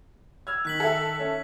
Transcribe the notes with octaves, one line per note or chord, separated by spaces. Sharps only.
E6 F6 G#6
D#3 F#6 B6 F#7
A4 E5
C#4